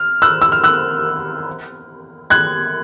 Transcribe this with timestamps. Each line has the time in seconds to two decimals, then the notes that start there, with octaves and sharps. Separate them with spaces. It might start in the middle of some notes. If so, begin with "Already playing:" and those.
Already playing: F6
0.22 E6 F#6
0.42 E6
0.52 F6
0.64 E6 F#6
2.30 F#6 G#6